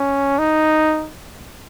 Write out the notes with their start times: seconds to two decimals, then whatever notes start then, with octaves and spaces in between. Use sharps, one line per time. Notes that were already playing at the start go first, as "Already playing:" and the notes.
Already playing: C#4
0.39 D#4